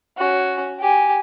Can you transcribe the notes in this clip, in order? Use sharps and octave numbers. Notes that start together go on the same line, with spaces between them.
C#4 F#4
G4 G#5